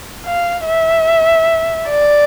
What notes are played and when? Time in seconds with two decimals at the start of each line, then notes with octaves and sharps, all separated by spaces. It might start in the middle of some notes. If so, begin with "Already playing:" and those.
0.26 F5
0.66 E5
1.89 D5